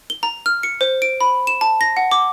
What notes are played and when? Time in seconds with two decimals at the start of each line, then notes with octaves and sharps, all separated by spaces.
0.10 G7
0.23 A#5
0.46 F6
0.63 C#7
0.81 C5
1.02 D7
1.21 B5
1.47 E7
1.61 A5
1.81 A#6
1.97 F#5
2.11 D6